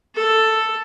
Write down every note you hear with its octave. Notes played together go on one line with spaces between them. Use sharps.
A4